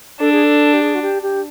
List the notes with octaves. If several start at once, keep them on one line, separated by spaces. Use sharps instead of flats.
D4 A4
G#4
A4
G4
G#4
F#4
G4
G4